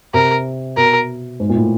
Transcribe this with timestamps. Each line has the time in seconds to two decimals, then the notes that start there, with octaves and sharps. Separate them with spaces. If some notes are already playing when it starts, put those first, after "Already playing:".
0.14 C3 A#4
0.77 B2 A#4
1.40 G#2
1.49 A#2
1.56 A2